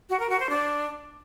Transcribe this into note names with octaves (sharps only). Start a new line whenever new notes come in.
F#4
A#4
F#4
C5
D4